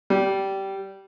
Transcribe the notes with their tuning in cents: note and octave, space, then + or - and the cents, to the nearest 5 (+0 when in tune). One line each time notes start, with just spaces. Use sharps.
G3 -15